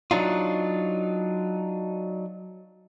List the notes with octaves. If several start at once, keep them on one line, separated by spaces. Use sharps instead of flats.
F#3 D4 D#4 F4